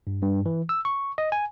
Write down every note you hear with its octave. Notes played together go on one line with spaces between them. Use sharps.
G2
G2
E3
E6
C#6
D#5
G#5